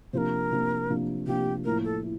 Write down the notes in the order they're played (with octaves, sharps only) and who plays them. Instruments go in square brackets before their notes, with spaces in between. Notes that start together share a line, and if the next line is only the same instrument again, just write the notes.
[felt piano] C3 F3 A#3 D4 [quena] A#4 C5
[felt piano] C3 F3 A#3 D4
C3 F3 A#3 D4
[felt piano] C3 F3 A#3 D4 [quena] G4
[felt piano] A2 F3 A#3 E4 [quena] A#4
[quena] A4
[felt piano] E4